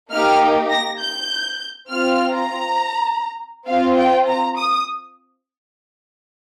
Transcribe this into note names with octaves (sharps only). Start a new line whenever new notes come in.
A#3 D#4 G4 F6
A#6
G6
C4 F4 F6
A#5
C4 F4 F5
G5
A#5
D#6